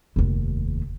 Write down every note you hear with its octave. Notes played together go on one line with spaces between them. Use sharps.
F1 D#2